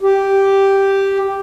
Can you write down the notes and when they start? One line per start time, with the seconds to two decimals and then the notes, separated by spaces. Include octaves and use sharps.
0.01 G4